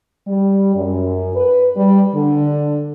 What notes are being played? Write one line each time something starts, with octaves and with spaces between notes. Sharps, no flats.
G3
F#2
B4
G3
D3